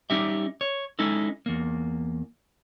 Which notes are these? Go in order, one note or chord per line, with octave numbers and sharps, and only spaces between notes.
G3 C#4 D#4 G4 E5
C#5
G#3 C#4 D#4 E4 A4
E2 A#3